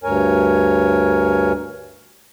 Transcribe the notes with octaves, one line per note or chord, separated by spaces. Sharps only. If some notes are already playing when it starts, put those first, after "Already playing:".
D2 G2 A#4 C#5 G#5